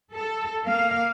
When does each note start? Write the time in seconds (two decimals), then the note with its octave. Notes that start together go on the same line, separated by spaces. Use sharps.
0.13 A4
0.64 A#3 F5